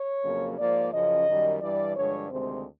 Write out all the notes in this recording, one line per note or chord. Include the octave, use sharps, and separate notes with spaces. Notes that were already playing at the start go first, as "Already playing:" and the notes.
Already playing: C#5
F2 C#3 F#3 A#3
G#2 F3 A#3 D5
F#2 C#3 F3 D#5
F#2 D#3 G3
G2 E3 G3 D5
G2 D3 F3 G#3 C#5
D2 C3 D#3 G#3 C4 C5